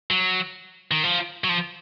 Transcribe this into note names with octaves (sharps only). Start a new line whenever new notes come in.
F#3
D#3
F3
F#3
F3